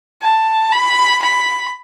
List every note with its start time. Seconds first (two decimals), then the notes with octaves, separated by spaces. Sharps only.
0.23 A5
0.72 B5
1.22 B5